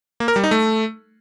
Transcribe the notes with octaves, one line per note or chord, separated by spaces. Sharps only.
A#3
A#4
G3
D#4
A3